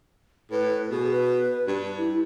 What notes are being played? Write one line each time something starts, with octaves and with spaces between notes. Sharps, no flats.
A2 B4
B2 G#4
B4
G2
E4